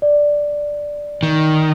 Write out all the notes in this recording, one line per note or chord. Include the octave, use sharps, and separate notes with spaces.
D5
D#3